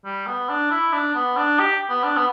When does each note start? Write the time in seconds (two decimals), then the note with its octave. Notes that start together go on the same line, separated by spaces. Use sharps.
0.05 G3
0.27 B3
0.49 D4
0.71 E4
0.93 D4
1.15 B3
1.37 D4
1.60 G4
1.89 B3
2.04 D4
2.17 B3